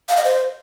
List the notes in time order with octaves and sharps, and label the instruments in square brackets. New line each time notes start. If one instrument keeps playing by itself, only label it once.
[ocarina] F5
D#5
C5